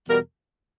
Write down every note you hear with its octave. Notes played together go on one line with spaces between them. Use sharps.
E2 B2 G3 A#4